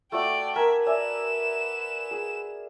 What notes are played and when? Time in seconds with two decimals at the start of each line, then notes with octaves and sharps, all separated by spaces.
0.12 A3 F#4 D5 G5 D6
0.56 A#4 E5 G#5 A#5
0.87 B4 D5 E5 G#5 E7
2.11 G#4